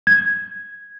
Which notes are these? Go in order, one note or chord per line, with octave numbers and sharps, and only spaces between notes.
G#6